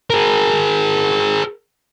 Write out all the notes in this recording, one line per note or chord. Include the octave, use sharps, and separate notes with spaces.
G#4 A#4